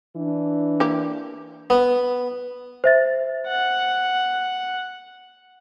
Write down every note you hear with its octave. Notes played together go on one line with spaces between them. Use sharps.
E3 D4
A#3 E4 G4
B3
C5 E5 A6
F#5